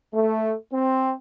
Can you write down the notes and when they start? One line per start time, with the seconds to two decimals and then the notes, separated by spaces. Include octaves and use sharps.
0.14 A3
0.73 C4